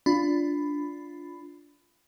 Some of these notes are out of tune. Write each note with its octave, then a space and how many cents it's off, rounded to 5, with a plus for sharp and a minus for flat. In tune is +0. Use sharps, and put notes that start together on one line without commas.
D4 -10 F4 +0 B5 +15